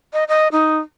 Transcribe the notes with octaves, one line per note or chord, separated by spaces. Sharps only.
D#5
D#5
D#4